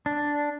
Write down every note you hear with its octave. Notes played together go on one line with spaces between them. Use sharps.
D4